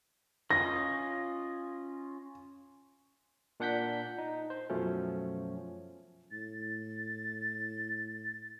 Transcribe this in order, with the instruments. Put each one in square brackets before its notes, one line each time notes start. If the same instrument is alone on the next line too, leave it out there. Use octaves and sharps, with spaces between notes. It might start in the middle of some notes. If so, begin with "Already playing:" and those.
[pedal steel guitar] C#4 F4 D#5 [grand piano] A#6
[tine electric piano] A#2 D4 F#5 G6 B6
D#4
C5
F#2 B2 F3 F#3 A3 C#4
[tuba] A2 [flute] A6